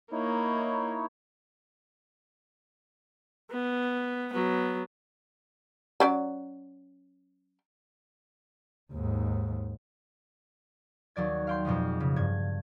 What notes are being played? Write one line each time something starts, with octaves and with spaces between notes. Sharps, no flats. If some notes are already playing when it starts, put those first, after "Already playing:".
A#3 D#4 E4 C#5
B3
F#3 B3
F#3 C#4 D5
D#2 G#2
D#2 F#3 D5 G#6
F5 G5 C6
F2 B2 F3 G#3
C#3
G2 G#6